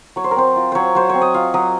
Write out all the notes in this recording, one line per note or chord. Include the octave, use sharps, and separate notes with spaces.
F#3 C#5
C5
A#4
C4 C5
F4
F#3 C5 C#5
F#3 C5
C4 C#5
D#5
F4 F5
F#3 D#5